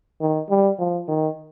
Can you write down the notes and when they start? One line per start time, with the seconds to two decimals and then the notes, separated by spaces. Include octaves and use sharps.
0.21 D#3
0.50 G3
0.79 F3
1.08 D#3